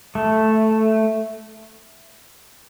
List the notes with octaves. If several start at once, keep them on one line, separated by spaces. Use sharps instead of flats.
A3